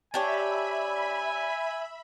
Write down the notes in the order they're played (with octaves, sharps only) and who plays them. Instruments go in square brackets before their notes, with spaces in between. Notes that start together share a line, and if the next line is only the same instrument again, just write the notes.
[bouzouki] D4 G4 C#5 [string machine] E5 B5 [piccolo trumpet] G#5